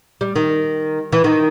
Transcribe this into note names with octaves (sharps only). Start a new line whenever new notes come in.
G3
D#3
E3
D#3